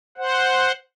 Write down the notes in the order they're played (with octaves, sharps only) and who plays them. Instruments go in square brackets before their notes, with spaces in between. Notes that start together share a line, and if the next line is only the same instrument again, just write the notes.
[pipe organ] C5 F#5